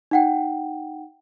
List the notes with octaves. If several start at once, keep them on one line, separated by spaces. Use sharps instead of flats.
D#4 F#5 G5